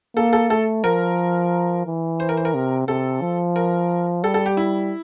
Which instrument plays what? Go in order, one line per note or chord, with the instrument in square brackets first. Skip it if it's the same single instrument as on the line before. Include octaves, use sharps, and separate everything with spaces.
[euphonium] A#3 [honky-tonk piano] A4
[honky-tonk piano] A4
[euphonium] A3 [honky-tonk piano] A4
[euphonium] F3 [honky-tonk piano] A#4
[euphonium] E3
[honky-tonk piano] C5
A#4
C5
A#4
[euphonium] C3
[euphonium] C3 [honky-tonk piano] A4
[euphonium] F3
[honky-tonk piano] A#4
[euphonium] G3 [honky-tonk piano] A4
[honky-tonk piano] A4
G4
E4